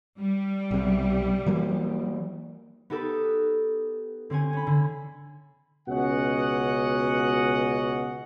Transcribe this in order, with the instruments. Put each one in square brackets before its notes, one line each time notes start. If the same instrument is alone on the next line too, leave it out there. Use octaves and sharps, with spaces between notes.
[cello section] G3
[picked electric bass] B1 C3
E3 F#3 A#3
[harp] B3 D#4 G4 A4 B4
D3 C4 C#4 G#5
C#4 B5
D3
[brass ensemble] C#2 B2 C#4 D#5 F#5